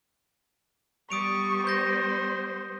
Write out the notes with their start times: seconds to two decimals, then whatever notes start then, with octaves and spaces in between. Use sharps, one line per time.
1.10 G3 B3 C#6 D#6 D7 F7
1.67 C5 G6 A#6